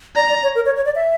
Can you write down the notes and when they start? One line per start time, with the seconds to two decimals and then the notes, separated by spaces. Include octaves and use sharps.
0.16 D5 A#5
0.29 D5
0.43 C#5
0.55 A#4
0.66 C#5
0.76 C#5
0.86 D5
0.95 E5